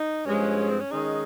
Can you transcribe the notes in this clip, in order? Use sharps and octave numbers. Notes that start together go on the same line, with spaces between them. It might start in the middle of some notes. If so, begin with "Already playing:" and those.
Already playing: D#4
G2 F3 G#3 C#4
C4
C#4
D#3 G#3 C#4 D#4 G#4